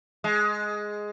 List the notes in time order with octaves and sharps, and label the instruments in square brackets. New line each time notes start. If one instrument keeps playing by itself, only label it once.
[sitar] G#3